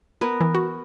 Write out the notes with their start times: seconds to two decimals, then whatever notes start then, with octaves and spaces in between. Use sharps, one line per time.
0.21 B3 A#4
0.41 E3
0.55 F#4